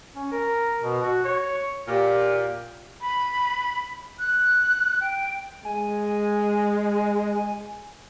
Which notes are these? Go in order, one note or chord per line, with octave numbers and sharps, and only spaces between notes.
C#4
A#4
B2
F#4
C#5
A#2 G4
B5
F#6
G5
G#3 G#5